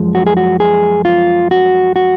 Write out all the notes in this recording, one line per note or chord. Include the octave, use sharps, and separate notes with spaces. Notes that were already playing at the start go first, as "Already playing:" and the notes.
Already playing: F#2 F3 G#3
F#4
G#4
F#4
G#4
F4
F#4
F#4